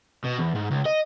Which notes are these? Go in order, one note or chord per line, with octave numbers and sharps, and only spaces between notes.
B2
E2
G#2
C#2
D#5